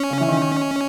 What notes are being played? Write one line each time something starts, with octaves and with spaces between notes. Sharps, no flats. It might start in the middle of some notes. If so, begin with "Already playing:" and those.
Already playing: C#4
C#3
E3
D#3